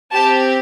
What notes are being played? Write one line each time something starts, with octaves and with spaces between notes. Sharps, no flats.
C4 G4 A5